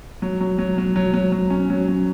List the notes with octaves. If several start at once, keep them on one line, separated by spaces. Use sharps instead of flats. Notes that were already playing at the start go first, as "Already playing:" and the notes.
F#3
F#3
F#3
F#3
F#3
F#3
F#3
C#4
F#3
F#3